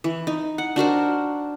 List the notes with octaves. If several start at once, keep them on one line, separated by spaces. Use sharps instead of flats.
E3
D#4
F#5
D4 F#4 A#4 C5